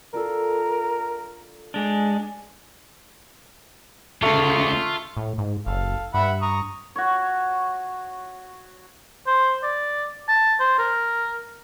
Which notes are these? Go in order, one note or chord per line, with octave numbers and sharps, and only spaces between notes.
D4 F4 A4 A#4
G#3 D4 G#5 D6 A#6
D2 C#3 A3 F4
A2
G#2
F#1 A4 F5
G2 E5 F#5 B5
A#5 C#6 D#6
F#4 C#5
C5
D5
A5
C5
A#4